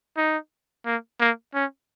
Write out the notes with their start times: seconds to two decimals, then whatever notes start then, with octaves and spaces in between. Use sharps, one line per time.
0.17 D#4
0.86 A#3
1.20 A#3
1.54 C#4